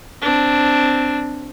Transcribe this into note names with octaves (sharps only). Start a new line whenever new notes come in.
C4 D4